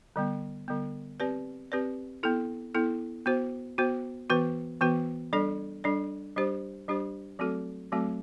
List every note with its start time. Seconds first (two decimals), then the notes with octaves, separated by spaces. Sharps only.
0.16 D3 G3 B3
0.68 D3 G3 B3
1.20 C4 G4 B4 D5
1.72 C4 G4 B4 D5
2.23 B3 E4 A4
2.75 B3 E4 A4
3.26 B3 F#4 C5
3.78 B3 F#4 C5
4.30 E3 B3 F#4 B4
4.81 E3 B3 F#4 B4
5.33 G3 D4 A4 D5
5.84 G3 D4 A4 D5
6.36 G3 D4 G4 C5
6.88 G3 D4 G4 C5
7.39 F#3 A3 C4 F#4 A4
7.92 F#3 A3 C4 F#4 A4